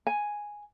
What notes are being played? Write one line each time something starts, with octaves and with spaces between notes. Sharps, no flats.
G#5